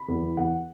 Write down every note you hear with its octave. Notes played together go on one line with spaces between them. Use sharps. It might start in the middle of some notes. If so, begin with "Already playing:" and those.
Already playing: B5
E2
E3
E2 F#5